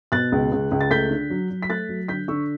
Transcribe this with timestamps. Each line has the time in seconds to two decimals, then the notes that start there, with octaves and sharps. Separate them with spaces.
0.12 B2 F#6 A6
0.32 C#2
0.52 C#2
0.71 C#2
0.81 A6
0.91 A3 G6 B6
1.11 D3
1.30 F#3
1.51 F#3
1.63 B6
1.69 A3 F#6 A6
1.89 F#3
2.08 D3 G6 B6
2.28 D3 C#6 E6